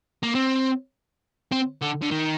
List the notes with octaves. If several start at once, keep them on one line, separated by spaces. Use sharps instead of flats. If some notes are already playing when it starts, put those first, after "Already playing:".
A#3
C4
C4
D3
D3
D#3